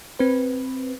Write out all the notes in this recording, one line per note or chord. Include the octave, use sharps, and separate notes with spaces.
C4 B4